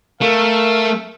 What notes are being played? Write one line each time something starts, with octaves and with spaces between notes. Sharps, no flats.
A3 A#4 F5